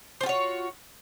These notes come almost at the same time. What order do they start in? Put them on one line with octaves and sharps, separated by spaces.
C5 F4 F#4 C#5